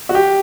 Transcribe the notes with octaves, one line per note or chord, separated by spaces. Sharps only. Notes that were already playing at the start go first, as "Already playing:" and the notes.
F#4
G4